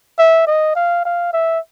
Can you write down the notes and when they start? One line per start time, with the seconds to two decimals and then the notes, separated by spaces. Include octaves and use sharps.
0.19 E5
0.47 D#5
0.76 F5
1.05 F5
1.33 E5